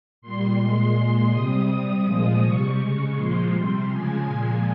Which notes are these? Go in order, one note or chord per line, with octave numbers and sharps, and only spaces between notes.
A#2 G3 C6
A#2 G#3
A#2 G#3
C3 G3 D#6
C3 G3
A#2 F3 G#3
C3 G3 C#6
C#3 G#3
A#2 F3 G#3 C6
C3 G3
C#3 F3 G#3 G#5
A#2 F3 G#3